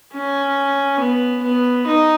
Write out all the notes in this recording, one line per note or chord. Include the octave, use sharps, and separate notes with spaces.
C#4
B3
B3
D#4